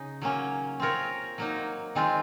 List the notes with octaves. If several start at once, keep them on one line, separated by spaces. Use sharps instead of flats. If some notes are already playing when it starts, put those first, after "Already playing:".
Already playing: C#3 D#4
F#3 A#3 C#4
C4 F4 A#4 C#5
F#3 A#3 D#4
D#3 G#3 C4 F4